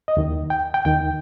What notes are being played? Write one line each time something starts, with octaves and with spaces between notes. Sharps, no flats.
D#5
D#2 D#3
G5
G5
D#2 D#3 G5